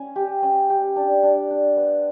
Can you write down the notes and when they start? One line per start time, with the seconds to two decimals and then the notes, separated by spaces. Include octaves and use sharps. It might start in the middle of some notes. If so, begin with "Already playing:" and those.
Already playing: C#4
0.16 G4
0.42 C#4
0.70 G4
0.96 D4
1.23 D4
1.51 D4
1.76 B3